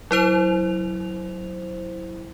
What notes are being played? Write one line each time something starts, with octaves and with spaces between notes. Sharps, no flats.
F#3 E4 C5 F7